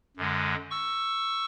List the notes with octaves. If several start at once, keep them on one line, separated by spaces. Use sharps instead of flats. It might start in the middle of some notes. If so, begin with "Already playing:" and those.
F#2 D3 G#3
C#6 E6